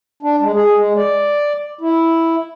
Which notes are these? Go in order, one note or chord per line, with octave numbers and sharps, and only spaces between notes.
D4
G#3
G#4
G#3
D5
E4